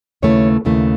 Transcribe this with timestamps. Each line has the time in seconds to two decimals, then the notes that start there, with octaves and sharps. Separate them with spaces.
0.22 D#2 C#3 E3 A3 C#5
0.65 D#2 C#3 E3 A3